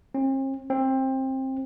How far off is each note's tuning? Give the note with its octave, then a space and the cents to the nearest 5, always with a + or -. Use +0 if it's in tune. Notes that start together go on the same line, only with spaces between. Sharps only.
C4 +45
C4 +20